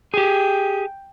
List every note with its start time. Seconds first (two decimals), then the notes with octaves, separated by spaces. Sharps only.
0.14 G4 G#4 G5